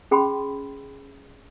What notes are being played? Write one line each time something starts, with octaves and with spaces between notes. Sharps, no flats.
C#4 G#4 G5 B5 C6